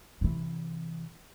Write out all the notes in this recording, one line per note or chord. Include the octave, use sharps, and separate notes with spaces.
C3 E3